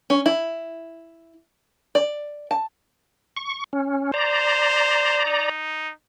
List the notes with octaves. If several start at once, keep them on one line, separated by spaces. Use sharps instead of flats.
C#4
E4
D5
A5
C#6
C#4
C5 D5 A#5
D#4